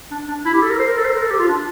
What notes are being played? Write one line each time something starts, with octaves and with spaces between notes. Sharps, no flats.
D4
D4
E4
G4
A4
A#4
C5
A#4
A4
C5
A#4
A4
G4
F4
D4